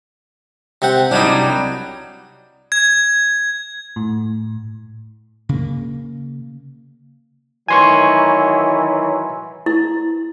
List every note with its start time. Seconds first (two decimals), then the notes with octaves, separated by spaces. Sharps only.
0.82 C3 C4 F#5
1.11 C2 F#3 G3 D4 D#4
2.72 G#6
3.96 A2
5.49 C#3 A#3
7.68 D#3 E3 F#3 G#5 C6 C#6
9.66 E4